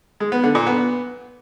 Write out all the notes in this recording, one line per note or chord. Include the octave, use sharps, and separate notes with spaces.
G#3
B3
D3
A#2
B3